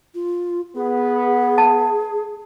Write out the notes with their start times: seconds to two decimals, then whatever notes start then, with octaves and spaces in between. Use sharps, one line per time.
0.14 F4
0.76 B3 G#4
1.58 A5